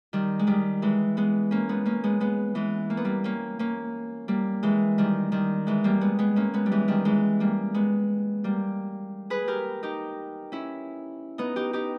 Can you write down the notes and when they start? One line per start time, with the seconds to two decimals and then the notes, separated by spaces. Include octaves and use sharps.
0.13 D#3 G3
0.39 G#3
0.47 D#3 G3
0.82 E3 G#3
1.17 G#3 B3
1.51 A#3 C#4
1.69 G#3 B3
1.85 A#3 C#4
2.04 G#3 B3
2.20 G#3 B3
2.55 E3 G#3
2.90 A#3
2.97 B3
3.04 G3 A#3
3.24 A#3 C#4
3.59 A#3 C#4
4.28 G3 A#3
4.63 E3 G#3
4.98 D#3 G3
5.32 D#3 G3
5.67 E3 G#3
5.84 G3 A#3
6.01 G#3 B3
6.19 G#3 B3
6.36 A#3 C#4
6.54 G#3 B3
6.66 G3
6.72 E3 G#3
6.88 D#3 G3
7.05 E3 G#3
7.40 G3 A#3
7.74 G#3 B3
8.44 G3 A#3
9.30 G#4 B4
9.48 G4 A#4
9.83 D#4 G4
10.52 C#4 E4
11.38 B3 D#4
11.56 D#4 G4
11.73 D#4 G4